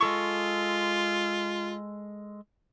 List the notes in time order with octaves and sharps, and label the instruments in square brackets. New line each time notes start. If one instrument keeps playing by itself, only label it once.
[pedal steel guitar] G#3 A4 C#6 [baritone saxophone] F4